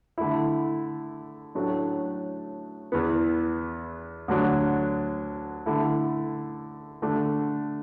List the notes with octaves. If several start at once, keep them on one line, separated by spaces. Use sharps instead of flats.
D3 A3 E4
A2 F#3 A3 D4
E2 E3 B3
D2 D3 F#3 D4
D3 A3 E4
D3 A3 D4